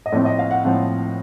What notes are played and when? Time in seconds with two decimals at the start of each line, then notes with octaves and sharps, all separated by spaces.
0.06 D#5
0.12 A2 F3 A3 C4 D5
0.25 D#5
0.39 F5
0.51 F#5
0.64 A2 F3 A3 C4 F#5